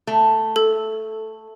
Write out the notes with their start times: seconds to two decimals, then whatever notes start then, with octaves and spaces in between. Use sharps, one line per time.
0.07 A3
0.56 A4